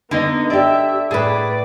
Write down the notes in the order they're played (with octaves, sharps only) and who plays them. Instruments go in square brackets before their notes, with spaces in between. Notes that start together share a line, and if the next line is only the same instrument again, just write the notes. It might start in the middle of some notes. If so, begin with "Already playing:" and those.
[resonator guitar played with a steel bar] D3 [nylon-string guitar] A#3 D#4 D#5 [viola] B3
[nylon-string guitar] G4 D5 [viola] E5
[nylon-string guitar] A2 [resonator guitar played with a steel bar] G#4 B4 [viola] D5